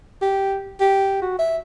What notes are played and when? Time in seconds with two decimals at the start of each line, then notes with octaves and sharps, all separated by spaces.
0.22 G4
0.81 G4
1.22 F#4
1.39 E5